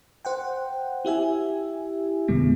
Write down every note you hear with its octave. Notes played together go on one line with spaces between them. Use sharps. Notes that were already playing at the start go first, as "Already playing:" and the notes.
C5 F#5 G5
E4 G4 E5 G#5
F2 B2 D3 G#3 B3